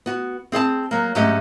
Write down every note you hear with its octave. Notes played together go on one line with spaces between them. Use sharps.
B3 F#4
C4 G#4 D#5 A5
F#3 A#3
G#2 F#3 A3 C#4 G4 D#5